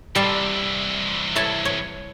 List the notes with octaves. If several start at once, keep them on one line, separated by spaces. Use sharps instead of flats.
C3 E3 G3 A5 C6
E4 C#5 A5
C#5